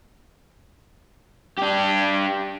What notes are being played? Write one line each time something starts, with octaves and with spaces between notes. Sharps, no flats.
D4 G4